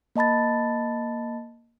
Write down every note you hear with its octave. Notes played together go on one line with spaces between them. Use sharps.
A#3 D#5 A5 B5 A6